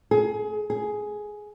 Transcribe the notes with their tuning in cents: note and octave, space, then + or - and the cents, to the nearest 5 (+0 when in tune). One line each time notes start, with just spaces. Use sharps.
G#4 +25
G#4 +10